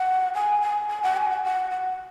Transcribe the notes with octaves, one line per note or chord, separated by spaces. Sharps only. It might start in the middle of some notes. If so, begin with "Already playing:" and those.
Already playing: F#5
G#5
G#5
G#5
F#5
G#5
F#5
F#5
F#5